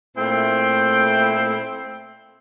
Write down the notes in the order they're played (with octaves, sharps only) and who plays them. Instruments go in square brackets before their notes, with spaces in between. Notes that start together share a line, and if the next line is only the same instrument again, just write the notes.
[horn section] A#2 A3 C4 E4 G5